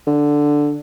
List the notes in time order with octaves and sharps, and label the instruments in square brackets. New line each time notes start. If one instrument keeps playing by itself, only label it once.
[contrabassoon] D3